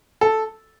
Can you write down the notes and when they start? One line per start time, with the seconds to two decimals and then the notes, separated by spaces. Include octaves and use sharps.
0.21 A4